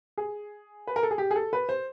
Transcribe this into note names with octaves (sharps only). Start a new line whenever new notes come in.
G#4
B4
A#4
A4
G#4
G4
G#4
A4
B4
C5